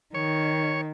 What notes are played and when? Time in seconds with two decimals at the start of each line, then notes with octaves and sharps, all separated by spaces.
0.15 D#3 C#5